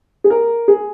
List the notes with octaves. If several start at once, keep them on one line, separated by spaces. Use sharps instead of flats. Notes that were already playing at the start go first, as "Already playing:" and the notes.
G#4
A#4
G#4